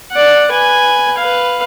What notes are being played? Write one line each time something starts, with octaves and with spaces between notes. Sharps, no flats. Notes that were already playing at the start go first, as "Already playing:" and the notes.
D5 F#5
B4 G#5
B4 F5